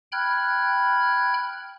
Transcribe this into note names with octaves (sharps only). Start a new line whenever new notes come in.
G5 B5 F6 F#6 G#6